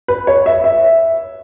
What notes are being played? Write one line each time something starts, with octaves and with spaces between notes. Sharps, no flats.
B4
C#5
E5
E5